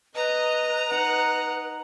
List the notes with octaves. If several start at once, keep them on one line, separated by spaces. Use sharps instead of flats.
B4 D#5 A#5
D#4 F#5